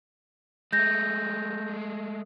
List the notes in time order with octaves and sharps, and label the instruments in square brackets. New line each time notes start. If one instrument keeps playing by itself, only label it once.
[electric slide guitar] G#3 A3 [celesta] G6 A#6